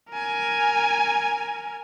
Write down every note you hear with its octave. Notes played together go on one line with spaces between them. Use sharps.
A#4 G#5